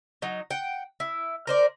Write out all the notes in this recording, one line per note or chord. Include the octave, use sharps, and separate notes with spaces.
F#3 D#4
F#5 G5
E4
A#4 C5 D5